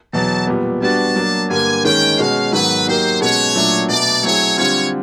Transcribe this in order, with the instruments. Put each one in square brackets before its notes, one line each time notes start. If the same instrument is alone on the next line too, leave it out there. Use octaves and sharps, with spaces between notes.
[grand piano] E2 B2 F#3 [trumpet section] A5
[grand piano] A#2 G3 B3
[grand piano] G3 B3 D4 F#4 [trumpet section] A5
[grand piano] F#3 A#3 D4
[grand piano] G2 D3 G3 A#3 [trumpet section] G#5
[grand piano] D#3 G#3 C#4 [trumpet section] G5
[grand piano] B2 G#3 C#4 F#4 [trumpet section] F5
[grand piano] G#2 D#3 F#3 B3 [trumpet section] B4
[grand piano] F#3 A#3 D#4 G4 A#4 [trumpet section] C5
[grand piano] B2 G#3 C#4 F#4 [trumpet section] C#5
[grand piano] A#2 F#3 A3 D4
[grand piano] B2 F#3 A3 [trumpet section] D5
[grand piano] F#3 A3 C4 E4 G#4 [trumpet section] C#5
[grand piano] D3 G3 C4 F4 [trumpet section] C#5